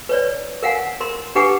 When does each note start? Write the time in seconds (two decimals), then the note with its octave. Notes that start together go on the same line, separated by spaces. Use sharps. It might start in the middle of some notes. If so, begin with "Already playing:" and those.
0.09 B4 C#5 D5
0.63 A#4 F5 F#5 G#5
1.00 A#4 C6
1.35 D4 G4 B4 F#5 G#5 D6